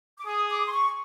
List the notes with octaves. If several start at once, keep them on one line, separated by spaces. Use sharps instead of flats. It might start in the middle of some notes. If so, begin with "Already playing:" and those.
D6
G#4 D#6
D6
C6
C#6